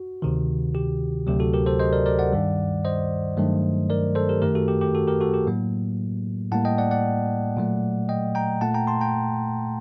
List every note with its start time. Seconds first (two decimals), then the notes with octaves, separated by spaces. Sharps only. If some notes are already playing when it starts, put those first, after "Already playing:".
Already playing: F#4
0.22 D2 C3 D#3
0.75 G4
1.27 D2 C3 F#3 G4
1.40 F#4 A4
1.54 G4 A#4
1.66 A4 C5
1.80 C5 D#5
1.93 A#4 D5
2.06 A#4 D5
2.19 D5 F#5
2.32 G2 D#3 G3
2.85 C5 D#5
3.37 G2 D#3 F#3 A3
3.90 A#4 D5
4.15 A4 C5
4.29 G4 A#4
4.42 F#2 D#3 A3 G4 A#4
4.55 F#4 A4
4.68 G4
4.81 G4
4.95 F#4 A4
5.07 G4 A#4
5.21 F#4 A4
5.34 G4
5.47 A2 F#3 A#3
6.52 A2 G3 A#3 F#5 A5
6.65 D#5 G5
6.78 D5 F#5
6.91 D5 F#5
7.57 A#2 F#3 A3
8.09 D#5 G5
8.35 G5 A#5
8.61 A#2 A3 F#5 A5
8.74 G5 A#5
8.87 A5 C6
9.01 G5 A#5